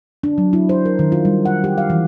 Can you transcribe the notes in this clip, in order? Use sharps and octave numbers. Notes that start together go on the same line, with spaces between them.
D4
F#3
E4
C5
A#4
D#3
F4
G3
F#5
G4
F5
E3